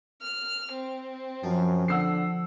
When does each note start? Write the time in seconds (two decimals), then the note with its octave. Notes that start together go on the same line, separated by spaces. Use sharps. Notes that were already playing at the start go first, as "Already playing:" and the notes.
0.21 F6
0.72 C4
1.44 F#2 F3
1.88 D3 F#5 E6 C7